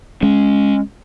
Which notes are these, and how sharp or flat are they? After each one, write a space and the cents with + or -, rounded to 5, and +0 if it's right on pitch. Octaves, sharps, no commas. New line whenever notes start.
G#3 +0 C#4 +0